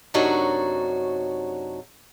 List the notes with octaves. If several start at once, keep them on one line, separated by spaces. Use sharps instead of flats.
F#2 C3 D4 D#4 F#4 C#5